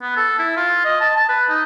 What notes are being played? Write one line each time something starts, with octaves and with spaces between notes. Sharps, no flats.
B3
A4
E4
F4
D#5
A5
A5
B4
D#4